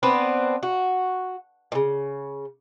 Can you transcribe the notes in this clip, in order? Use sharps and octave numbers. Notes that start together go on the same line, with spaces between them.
B3 C4 D4 B4
F#4
A#2 C#3